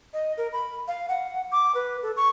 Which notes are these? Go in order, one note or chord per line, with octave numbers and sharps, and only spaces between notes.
D#5
A#4
B5
F5
F#5
D6
B4
A4
C#6